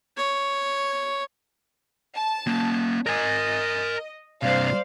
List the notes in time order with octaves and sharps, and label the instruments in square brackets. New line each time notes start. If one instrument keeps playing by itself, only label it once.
[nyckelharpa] C#5
[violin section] A5
[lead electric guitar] A#3 C#4
[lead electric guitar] A#4 G#5 [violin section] D#5
[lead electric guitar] G2 C3 [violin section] C5 D5 F5